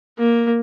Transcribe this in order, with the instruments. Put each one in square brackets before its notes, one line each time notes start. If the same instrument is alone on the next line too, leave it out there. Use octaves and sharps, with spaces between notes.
[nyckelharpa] A#3